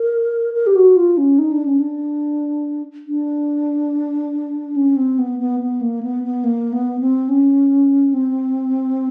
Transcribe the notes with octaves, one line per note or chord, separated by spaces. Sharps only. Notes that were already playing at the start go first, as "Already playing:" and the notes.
Already playing: A#4
A#4
G4
F#4
F4
C#4
D#4
D4
C#4
D4
D4
C#4
C4
B3
B3
B3
A#3
B3
B3
A#3
B3
C4
C#4
C4